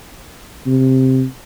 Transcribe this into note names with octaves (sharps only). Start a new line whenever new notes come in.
C3